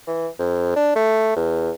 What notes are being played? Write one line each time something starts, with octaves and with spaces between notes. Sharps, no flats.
E3
F2
D4
A3
E2